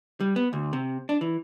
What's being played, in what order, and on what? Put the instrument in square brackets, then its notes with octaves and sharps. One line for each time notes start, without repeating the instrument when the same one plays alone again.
[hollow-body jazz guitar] G3
B3
D2
C3
D4
E3